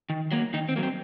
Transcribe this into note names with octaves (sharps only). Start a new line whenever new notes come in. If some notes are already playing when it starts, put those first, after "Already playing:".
D#3
F#3 A#3
D#3 D#4
C4
F#3 A#3
C4